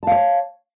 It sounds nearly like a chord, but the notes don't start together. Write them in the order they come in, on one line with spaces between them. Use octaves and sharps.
A5 F5 C#5